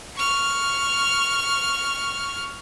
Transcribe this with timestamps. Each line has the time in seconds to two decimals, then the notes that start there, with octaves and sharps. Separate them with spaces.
0.15 C#6 F6